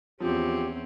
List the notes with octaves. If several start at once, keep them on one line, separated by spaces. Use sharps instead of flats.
E2 F3 C4 C#4 G4